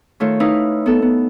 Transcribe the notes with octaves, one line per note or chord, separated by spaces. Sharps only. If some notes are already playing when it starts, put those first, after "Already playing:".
D#3 A3 F4 C#5
D#4 E4 B4 F5
B3 A4
B3